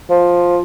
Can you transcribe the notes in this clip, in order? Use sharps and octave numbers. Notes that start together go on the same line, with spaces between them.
F3